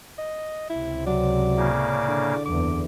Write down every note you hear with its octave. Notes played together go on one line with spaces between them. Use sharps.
D#5
C#2 C3 E4
F#3 D5
A2 C#3 A#3
D3
F#1 E2 D6